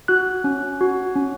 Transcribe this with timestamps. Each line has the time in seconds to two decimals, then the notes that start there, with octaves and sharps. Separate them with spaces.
0.08 F#4 F#6
0.44 C#4
0.81 F#4
1.16 C#4